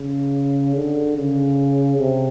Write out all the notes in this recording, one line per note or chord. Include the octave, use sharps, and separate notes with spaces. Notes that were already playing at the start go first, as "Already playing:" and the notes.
Already playing: C#3
D3
C#3
C3